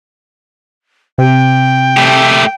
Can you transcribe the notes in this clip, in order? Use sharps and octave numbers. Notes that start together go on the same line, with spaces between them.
C3 G5
A3 G4